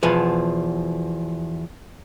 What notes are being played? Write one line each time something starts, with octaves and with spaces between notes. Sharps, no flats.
E2 B2 F3 B4